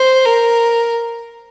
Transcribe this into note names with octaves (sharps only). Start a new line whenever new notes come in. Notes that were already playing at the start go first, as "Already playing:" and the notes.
Already playing: C5
A#4